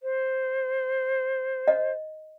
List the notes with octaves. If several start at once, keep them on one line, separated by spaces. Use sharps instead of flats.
C5
D#5